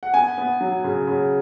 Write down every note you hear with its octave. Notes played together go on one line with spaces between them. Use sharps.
F#5
B3 G#5
B3
F#3
C#3
C#3